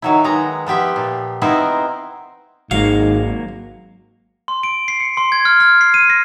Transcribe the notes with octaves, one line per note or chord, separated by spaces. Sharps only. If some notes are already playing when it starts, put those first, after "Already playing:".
D#3 F#3 E4
D#3 G#3 B3 A#5
F3 B3 G4 E5
A#2
B3 C4 D#4 E4 A#4 C5
G#1 G#2 F#3 A#3 F5
C6
D7
C7
C#7
C6
G#6
F6
F6
C7
D#7
A#6